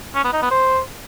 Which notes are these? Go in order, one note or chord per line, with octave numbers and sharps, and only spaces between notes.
C#4
B3
D#4
B3
C5